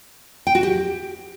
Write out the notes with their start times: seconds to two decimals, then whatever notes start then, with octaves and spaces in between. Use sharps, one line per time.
0.47 G5
0.55 F#4
0.63 G4